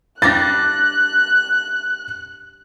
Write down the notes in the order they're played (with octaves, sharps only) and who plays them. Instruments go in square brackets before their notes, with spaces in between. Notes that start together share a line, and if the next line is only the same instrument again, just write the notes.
[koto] G3 D4 [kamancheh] F#6 [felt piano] A6 A#6